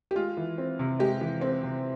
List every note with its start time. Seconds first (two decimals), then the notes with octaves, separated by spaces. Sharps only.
0.11 G4
0.15 G#3 F4
0.37 E3
0.58 C4
0.79 C3
0.99 G#3 G4
1.21 E3
1.41 C4
1.63 C3